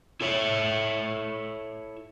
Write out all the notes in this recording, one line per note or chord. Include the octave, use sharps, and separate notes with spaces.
E4 A4 C#5 E5